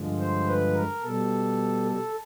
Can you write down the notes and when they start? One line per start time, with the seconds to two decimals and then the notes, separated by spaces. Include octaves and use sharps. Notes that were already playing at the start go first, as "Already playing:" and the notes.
Already playing: G2 D3 F3 G#3
0.19 C5
0.47 B4
0.74 A#4
1.03 B2 G3 A4
1.87 A4